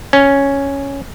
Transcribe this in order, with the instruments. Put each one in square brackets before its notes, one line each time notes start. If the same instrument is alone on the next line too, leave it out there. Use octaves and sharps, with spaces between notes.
[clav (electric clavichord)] C#4